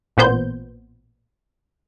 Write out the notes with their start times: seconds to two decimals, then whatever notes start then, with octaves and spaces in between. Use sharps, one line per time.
0.17 A1 A#2 B3 C5 G6